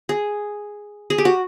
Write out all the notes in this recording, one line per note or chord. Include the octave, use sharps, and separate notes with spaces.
G#4
G#4
G4
F#4